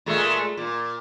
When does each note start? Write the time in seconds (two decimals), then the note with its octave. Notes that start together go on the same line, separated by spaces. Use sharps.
0.06 A#2 G#3 A3
0.57 A#2